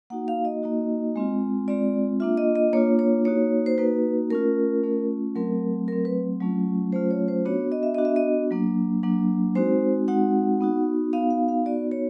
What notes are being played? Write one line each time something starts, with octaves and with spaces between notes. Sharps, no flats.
A#3 D#4 F#4 F#5
F5
D#5
A#3 D#4 F#4
G#3 C4 F4
G#3 C4 F4 D5
A#3 D4 F4 E5
D#5
D#5
A#3 D4 F4 C#5
C#5
A#3 D#4 F#4 C#5
C5
A#3 D#4 F#4 B4
A3 C#4 F4 A#4
A3 C#4 F4
F#3 A3 C4 A#4
F#3 A3 C4 A#4
B4
F#3 A3 C#4 F4
F#3 A3 C#4 F4 C5
C#5
C5
B3 D4 F#4 C#5
D#5
E5
B3 D4 F#4 D#5
E5
D#5
F#3 A#3 D4
F#3 A#3 D4
G#3 C4 D#4 F#4 C5
G#3 C4 D#4 F#4 F#5
B3 D#4 F#4
B3 D#4 F#4 F5
F5
F5
B3 D#4 F#4 D5
C#5